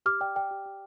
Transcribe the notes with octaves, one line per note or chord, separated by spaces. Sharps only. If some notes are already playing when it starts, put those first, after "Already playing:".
G4 D6 F6
D5 G5
D5 G5
G4
G4